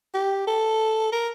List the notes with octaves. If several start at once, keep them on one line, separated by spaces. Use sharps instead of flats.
G4
A4
A#4